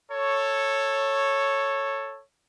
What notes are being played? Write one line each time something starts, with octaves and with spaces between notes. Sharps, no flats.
A4 C#5